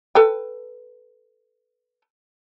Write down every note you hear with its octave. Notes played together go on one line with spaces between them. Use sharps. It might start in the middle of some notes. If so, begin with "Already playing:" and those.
A4 B4 G5